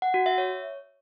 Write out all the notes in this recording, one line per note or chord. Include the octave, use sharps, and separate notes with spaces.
F#5
F#4
E5
C#5